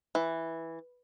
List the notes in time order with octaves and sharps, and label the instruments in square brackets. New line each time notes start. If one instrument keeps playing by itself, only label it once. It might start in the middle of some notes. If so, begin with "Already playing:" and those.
[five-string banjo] E3